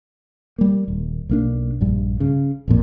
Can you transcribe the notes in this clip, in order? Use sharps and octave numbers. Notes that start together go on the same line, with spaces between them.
G3 A#3
D#1
B1 A#3 D4
A#1 G2
C#3
A1 F2 A#2